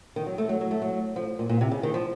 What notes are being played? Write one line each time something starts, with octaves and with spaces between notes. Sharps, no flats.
D#3
F#3
A3
F#3
F#3
A3
F#3
F3
A#2
A#2
C3
C#3
D#3
F3